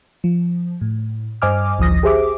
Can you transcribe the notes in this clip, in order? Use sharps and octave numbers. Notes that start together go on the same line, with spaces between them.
F3
A2
G2 C5 D#5 G#5 D6 F6
A1 D2 F3 D#6 A#6
G4 G#4 C5 E5 D6